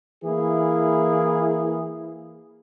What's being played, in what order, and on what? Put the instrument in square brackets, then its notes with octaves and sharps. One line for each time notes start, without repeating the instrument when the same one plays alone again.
[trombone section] E3 A#3 E4 G#4